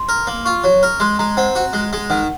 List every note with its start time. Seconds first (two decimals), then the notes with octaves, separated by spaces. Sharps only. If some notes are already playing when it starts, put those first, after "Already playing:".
Already playing: C6
0.09 A#4
0.27 A#3
0.45 F4 C#6
0.64 F#3
0.83 A#4
1.00 G#3 C6
1.19 G#3 A#5
1.37 C4 F#5
1.55 F#4
1.73 G#3
1.93 G#3
2.10 D#3 F#5